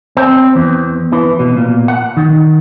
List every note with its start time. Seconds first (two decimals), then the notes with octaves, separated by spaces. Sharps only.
0.17 C4
0.55 E2
1.13 E3
1.39 B2
1.57 A#2
1.88 F#5
2.17 D#3